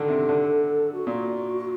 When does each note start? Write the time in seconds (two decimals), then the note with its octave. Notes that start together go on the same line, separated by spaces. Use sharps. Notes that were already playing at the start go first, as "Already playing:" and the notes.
Already playing: D3 D#3 A4
0.08 C3
0.29 D3
0.92 F#4
1.07 A#2